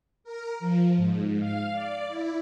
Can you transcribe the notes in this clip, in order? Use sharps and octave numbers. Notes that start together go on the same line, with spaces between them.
A#4
F3
G#2
F5
D5
E4